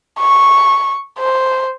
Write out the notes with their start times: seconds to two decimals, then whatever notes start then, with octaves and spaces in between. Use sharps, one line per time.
0.20 C#6
1.19 C5